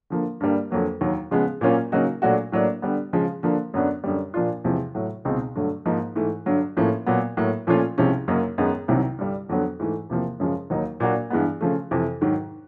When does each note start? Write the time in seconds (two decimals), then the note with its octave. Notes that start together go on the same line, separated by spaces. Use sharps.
0.10 D3 F3 A#3
0.41 G2 D3 G3 A#3
0.71 F2 D3 F#3 A#3
1.01 D#2 D#3 F#3
1.31 C#3 F3 G#3 B3
1.61 A#2 F#3 A#3 C#4 F4
1.92 C#3 F#3 A#3 D#4 F#4
2.22 A#2 F#3 A3 D4 F#4
2.52 A2 F#3 A#3 D4
2.82 D3 G3 B3
3.13 C#3 F3 G#3
3.43 D3 F3 A#3 D4
3.74 F#2 D3 F#3 B3 D4
4.04 F#2 D3 G3
4.34 A#2 F3 A#3 D4 F4
4.64 E2 C3 F3 G#3
4.95 A2 F#3 A3
5.25 C#2 B2 G#3 C4 D#4
5.55 G2 D3 F#3 A3
5.86 G#2 F3 A#3 D#4
6.16 G#2 E3 A3
6.46 G2 D3 F#3
6.77 A2 F3 A#3 C#4
7.06 A#2 F#3 B3
7.37 A2 F#3 A#3
7.67 A#2 F3 A3 C#4 F4
7.98 C2 C3 F3 G#3 C#4
8.28 F#2 C#3 F#3 A#3 D#4
8.58 F#2 D#3 G#3 B3 D#4
8.88 C2 C3 D#3 F#3
9.18 G2 D3 G3
9.49 F2 D3 F#3 B3
9.79 G#2 E3 A3
10.10 E2 C3 F3 A#3
10.40 F#2 C#3 F3 G#3
10.70 D#2 D#3 F#3 A#3 D#4
11.00 A#2 F#3 A#3 D4 F#4
11.30 G2 E3 G#3 B3
11.61 C#3 F3 A3
11.91 F2 C3 E3
12.21 G#2 D#3 F#3